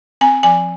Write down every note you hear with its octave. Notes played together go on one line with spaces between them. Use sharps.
C4 G#5
F3 G#5